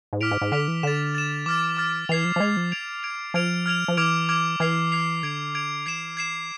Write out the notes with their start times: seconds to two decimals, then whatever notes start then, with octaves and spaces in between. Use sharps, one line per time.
0.13 G#2
0.21 A2 D6 F6 B6 D7 F7
0.31 G#2
0.42 G#2
0.52 D3 D6 F6 B6 D7 F7
0.68 E3
0.83 D3 A6 E7
1.15 A6 E7
1.46 E3 D6 F6 A6
1.77 D6 F6 A6
2.09 E3 G#6 C7 F7
2.25 F3
2.36 F3
2.40 G#3 G#6 C7 F7
2.57 F3
2.72 G#6 D7 F7
3.03 G#6 D7 F7
3.34 F3 F6 G#6 D7 F7
3.66 F6 G#6 D7 F7
3.88 F3
3.97 E3 D6 F6 G#6 D7 F7
4.29 D6 F6 G#6 D7 F7
4.60 E3 F6 G#6 C7 F7
4.92 F6 G#6 C7 F7
5.23 D3 G#6 D7 F7
5.55 G#6 D7 F7
5.86 E3 G#6 C7 E7
6.17 G#6 C7 E7